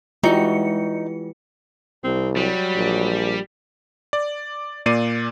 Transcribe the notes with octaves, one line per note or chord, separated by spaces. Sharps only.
E3 G3 G#3 D#4 F4 F#4 C#7
C2 C4
F#3 G3
A#1
D5
A#2 A#3 D5 C7 D#7